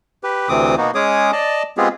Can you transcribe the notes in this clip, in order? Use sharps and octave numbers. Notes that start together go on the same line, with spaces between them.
G4 B4
D2 C3 E3 C4 D6 D#6
B2 A#3 B3 D#4 F#4
G#3 C#4 G#4 C#5 D6 D#6
D5 D#5 A5
G#3 B3 C4 F4 G4 G#4